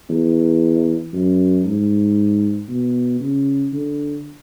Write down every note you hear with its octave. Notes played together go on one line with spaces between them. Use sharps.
E2
F#2
G#2
B2
C#3
D3